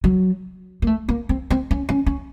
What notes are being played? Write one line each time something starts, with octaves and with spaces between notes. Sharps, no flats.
F#3
A#3
A3
A#3
C4
C4
C#4
C#4
C#4